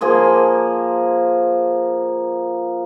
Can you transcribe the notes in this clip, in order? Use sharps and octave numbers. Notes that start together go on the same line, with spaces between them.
F3 A#3 G#4 C6